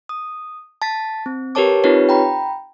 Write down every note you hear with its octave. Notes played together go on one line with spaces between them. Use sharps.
D#6
A5 A6 B6
C4
G4 A#4 B4 C#5 A5 D6
C4 D#4 F4 G4 B4 C#5
G5 A#5 B5